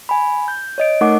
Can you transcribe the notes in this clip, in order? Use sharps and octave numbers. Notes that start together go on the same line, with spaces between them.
G#5 B5
G6
C#5 D#5 D7
A3 D#4 A#4 F#5 C#6 D6